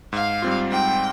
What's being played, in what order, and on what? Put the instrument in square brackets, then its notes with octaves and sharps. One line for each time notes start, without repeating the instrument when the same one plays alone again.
[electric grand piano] G#2 [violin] F5
[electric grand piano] G3 C4 F4
[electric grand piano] G#2 [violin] G5